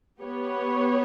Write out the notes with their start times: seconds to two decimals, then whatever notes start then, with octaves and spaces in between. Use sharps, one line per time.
0.21 B3 G4 C#5